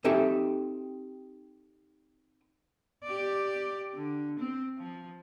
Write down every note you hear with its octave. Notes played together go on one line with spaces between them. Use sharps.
C4 D#4 G4 A4 E5 G#5
G4 D5
D3
C4
F3